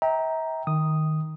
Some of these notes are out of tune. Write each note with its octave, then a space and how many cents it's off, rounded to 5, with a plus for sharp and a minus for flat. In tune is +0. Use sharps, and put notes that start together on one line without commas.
E5 -40 G5 +0 A#5 +0
D#3 -5 D#6 +0